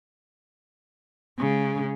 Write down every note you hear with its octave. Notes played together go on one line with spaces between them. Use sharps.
C#3 G#3